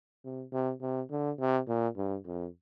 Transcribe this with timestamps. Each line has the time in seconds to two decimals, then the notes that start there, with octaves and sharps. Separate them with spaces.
0.24 C3
0.53 C3
0.81 C3
1.11 D3
1.39 C3
1.68 A#2
1.97 G2
2.26 F2